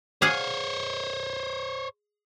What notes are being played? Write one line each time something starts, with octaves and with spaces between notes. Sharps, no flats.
G#4 C5 C#5 F5 F#5